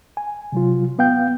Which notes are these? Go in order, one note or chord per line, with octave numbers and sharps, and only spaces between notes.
G#5
C3 F#3 F4
B3 F5 G5 G6